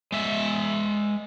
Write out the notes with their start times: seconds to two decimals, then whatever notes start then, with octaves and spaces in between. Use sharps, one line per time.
0.12 G#3 E5